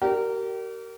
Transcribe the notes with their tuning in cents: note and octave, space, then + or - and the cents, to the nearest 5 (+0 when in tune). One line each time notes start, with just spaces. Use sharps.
G4 -40 A#4 -15 D5 +5